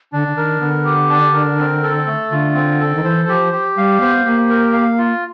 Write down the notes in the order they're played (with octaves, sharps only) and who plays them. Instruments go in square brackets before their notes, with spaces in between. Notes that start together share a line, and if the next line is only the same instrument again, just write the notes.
[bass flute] D3 [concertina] D4
[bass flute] D3
[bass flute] D#3 [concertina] A#4
[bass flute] D3 [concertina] B3
[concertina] G4
D4
A#4
C4
A4
A3
[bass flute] D3 [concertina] F4
[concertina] C4
A4
[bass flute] D#3
[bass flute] E3 [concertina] C5
[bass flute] F3 [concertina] G4
[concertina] G4
[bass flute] G3 [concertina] F5
[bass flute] B3 [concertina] C5
[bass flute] A#3 [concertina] G4
[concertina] A#4
F5
F4